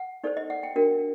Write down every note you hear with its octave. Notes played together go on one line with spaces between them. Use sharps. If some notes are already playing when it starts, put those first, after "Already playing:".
Already playing: F#5
D#4 A4 C5 D5
D#5
F#5
G5
D4 F#4 A#4 G5